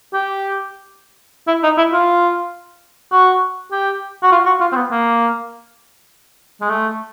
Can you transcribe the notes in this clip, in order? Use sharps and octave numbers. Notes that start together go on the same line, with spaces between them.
G4
E4
D#4
E4
F4
F#4
G4
F#4
F4
F#4
F4
C4
B3
A#3
G#3
A3